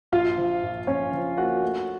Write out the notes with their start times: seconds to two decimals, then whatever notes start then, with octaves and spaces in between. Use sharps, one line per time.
0.12 A#1 F4 F5
0.38 F3
0.63 A#1
0.87 A#1 C#4 C#5
1.13 F3
1.37 A#3 F#4 F#5
1.63 A3